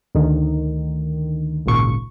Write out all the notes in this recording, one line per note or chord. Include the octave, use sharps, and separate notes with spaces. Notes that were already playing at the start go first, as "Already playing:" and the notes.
D2 D#3
G#1 C#2 A#2 C#6